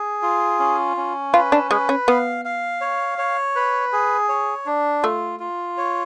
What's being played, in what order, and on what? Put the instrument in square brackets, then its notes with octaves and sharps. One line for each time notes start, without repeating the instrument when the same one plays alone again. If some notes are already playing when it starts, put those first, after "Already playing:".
Already playing: [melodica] G#4
F4
C#4
C#4
[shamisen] F4 [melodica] B4
[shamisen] D4
[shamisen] G#3 [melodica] B4
[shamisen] C#4
[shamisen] B3 [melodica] F5
[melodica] F5
C#5
C#5
B4
G#4
C#5
D4
[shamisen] A3 [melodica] F4
[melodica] F4
C#5